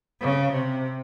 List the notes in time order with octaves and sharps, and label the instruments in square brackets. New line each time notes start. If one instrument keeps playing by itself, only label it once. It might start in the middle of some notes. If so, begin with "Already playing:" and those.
[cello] C#3
C3